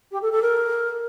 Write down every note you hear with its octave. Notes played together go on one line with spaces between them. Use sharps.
G4
A4
A4
A#4